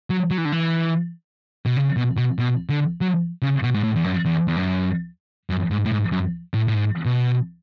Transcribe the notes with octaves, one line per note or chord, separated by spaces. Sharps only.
F#3
F#3
E3
D3
E3
B2
C#3
B2
B2
B2
D3
F#3
C#3
B2
G#2
A2
E2
F#2
E2
E2
F#2
F#2
G#2
A2
G#2
F#2
A2
A2
G#2
B2